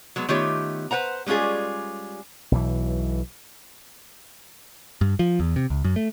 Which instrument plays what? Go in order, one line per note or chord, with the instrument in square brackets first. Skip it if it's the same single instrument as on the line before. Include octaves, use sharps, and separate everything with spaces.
[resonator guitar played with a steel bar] F#3 G#3 B3
D#3 A3 B3 F4 G4 C#5
B4 C5 F#5 A#5
G3 G#3 C#4 F4 G#4
[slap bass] B1 B2 E3
[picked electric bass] G2
F3
E2
C3
C#2
F#2
A3